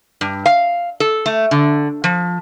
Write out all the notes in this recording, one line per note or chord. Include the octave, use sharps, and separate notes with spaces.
G2
F5
A4
A3
D3
F3